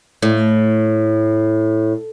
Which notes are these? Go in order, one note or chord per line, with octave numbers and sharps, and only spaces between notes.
A2